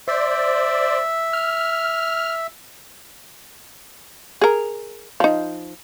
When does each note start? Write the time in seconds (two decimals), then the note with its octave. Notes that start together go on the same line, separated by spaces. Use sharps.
0.08 C5 D5 E5
1.33 F6
4.42 G#4 A#4
5.20 F3 D#4